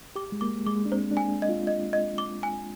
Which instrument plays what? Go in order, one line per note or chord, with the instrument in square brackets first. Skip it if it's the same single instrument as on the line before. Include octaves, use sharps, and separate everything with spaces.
[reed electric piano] G4 [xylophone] D6
[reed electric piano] G#3
[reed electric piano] A#3 [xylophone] D6
[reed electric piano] G#3 [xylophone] D6
[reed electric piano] D4
[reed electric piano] C4 [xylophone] C5
[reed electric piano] D4
[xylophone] G#5
D#5
[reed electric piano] F4
[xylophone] D#5
D#5
D6
G#5